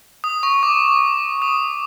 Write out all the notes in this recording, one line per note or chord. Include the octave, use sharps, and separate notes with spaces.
D#6
C#6
D6
D#6